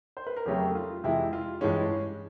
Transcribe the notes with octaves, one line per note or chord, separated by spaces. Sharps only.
C5
B4
A#4
F2 C#3 F#3 A3 G4
F4
F2 C3 E3 G#3 E4
F4
G2 E3 G#3 C#4